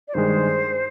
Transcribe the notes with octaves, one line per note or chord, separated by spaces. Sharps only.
D5
G2 D#3 G#3 C5